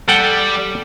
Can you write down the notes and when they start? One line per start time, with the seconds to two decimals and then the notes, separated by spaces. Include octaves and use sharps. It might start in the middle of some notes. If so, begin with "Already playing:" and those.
0.08 G3 A4 F#5 G5